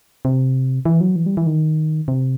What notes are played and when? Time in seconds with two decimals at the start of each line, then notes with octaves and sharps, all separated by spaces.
0.25 C3
0.85 E3
1.01 F#3
1.16 E3
1.26 G3
1.37 E3
1.46 D#3
2.08 C3